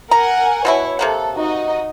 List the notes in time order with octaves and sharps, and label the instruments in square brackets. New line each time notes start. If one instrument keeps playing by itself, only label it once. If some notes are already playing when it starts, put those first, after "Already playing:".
[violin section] A#4 F#5 G#5 [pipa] A#5
[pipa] B2 C4 E4 [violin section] C#5
[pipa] C3 A#3 F#5 [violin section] A4
[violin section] D#4 F#4 D#5